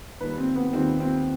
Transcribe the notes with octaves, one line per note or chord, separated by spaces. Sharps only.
D#2 D#3 G3 B4
C4
B3
D#2 D#3 G3 C4
C4